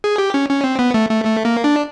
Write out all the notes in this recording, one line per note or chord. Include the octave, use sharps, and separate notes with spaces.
G#4
G4
C#4
C#4
C4
B3
A3
A3
A3
A#3
D4